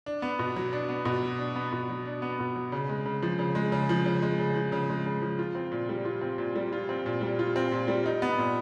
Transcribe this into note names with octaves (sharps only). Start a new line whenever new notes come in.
D4
B3
B2
F#3
D4
B3
B2
F#3
D4
B3
B2
F#3
D4
B3
B2
F#3
C#3
G#3
C#3
F3
C#3
G#3
C#3
F3
C#3
G#3
C#3
F3
C#3
G#3
C#3
F3
F4
C4
A#2
G3
F4
C4
A#2
G3
F4
C4
A#2
G3
F4
C4
A#2
G3
D#4
B3
A#2